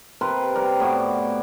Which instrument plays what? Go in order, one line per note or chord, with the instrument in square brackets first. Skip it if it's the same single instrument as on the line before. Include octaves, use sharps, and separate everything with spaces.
[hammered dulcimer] C3 A#4 B4 C6
G3 A#4
A2 B3 F#4 D5